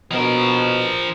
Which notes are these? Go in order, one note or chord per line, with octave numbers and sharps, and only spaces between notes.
B2 F3 A#4